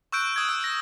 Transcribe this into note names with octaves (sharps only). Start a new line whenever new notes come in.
C#6 E6 F#6 G6 D7
D#6 G#6
E6
A#6